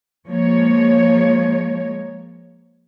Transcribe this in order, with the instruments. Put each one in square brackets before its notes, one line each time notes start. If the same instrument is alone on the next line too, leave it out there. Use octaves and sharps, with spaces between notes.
[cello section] F3 G#3 A#3 C#5